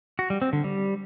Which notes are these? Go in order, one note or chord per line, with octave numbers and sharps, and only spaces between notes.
F#4
G3
C4
D3
G3